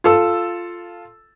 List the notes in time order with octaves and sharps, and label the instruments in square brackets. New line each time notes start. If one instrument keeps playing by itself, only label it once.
[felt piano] F4 A4 E6